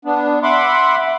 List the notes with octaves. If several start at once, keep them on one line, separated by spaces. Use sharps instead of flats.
B3 D4
E5 F#5 B5 C6 D6